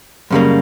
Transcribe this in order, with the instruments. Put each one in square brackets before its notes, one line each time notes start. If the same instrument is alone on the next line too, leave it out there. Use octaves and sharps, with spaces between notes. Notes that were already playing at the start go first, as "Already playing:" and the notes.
[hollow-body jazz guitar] F#2 C#3 G3 A#3